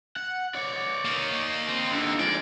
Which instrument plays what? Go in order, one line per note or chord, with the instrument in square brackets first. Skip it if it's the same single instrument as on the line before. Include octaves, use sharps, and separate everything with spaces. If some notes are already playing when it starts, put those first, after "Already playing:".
[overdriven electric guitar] F#5
C#5 D5
[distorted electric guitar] A#3 D#4
[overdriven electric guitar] C4
G2 D3
[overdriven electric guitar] F3 G#3 [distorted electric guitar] D5